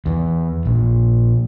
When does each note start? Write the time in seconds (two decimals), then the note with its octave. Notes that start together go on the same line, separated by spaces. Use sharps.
0.06 E2
0.65 A#1